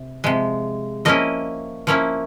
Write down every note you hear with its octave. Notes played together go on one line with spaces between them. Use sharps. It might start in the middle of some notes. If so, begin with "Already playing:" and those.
Already playing: C3
C3 F3 G#3
F3 A#3 C#4 E4 D#5
F3 A#3 C#4 E4